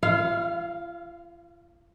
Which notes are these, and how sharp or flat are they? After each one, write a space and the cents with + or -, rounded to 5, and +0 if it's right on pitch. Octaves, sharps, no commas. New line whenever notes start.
F4 -40 F5 +0